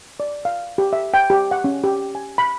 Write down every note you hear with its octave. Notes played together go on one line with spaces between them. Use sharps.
D5
F5
G4
E5
G5
G4
F#5
C#4
G4
G#5
B5